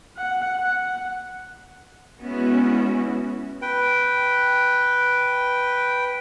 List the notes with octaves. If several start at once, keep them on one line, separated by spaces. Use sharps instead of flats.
F#5
F#5
G#3 B3 C#4 E4 F#4
B4 G5